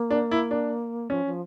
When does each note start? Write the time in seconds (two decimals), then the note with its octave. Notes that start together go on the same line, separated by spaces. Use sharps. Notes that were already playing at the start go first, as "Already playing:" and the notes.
Already playing: A#3
0.11 D4
0.31 E4
0.51 D4
1.10 F3 C#4
1.25 F3